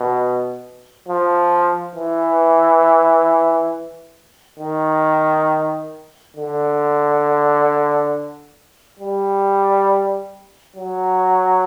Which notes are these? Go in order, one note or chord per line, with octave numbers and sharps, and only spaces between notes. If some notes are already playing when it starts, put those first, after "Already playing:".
Already playing: B2
F3
E3
D#3
D3
G3
F#3